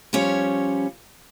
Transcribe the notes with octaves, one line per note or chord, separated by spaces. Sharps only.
F3 G3 C#4 C#5